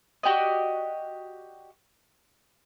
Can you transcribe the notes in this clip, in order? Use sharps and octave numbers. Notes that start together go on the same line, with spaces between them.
F#4 G4 D5 D#5